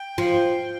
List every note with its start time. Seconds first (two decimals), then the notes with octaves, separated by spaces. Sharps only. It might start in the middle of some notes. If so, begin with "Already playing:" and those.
Already playing: G5
0.18 F3